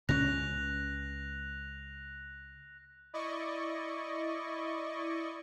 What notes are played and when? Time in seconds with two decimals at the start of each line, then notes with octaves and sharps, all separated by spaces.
0.09 C#2 C#3 C#4 F#6 A#6 F7
3.13 E4 D5 D#5 C#6